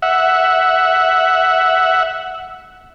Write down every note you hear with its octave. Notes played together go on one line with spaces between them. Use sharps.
E5 F#5